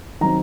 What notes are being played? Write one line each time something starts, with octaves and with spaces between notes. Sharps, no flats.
D#3 F#3 C4 A#5